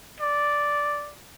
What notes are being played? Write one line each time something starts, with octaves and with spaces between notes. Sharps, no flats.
D5